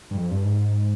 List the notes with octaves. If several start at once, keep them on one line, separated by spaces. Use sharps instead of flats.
G2
F2
G2
G#2